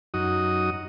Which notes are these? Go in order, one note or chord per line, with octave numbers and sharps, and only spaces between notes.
F#2 D#4 F#4 D#6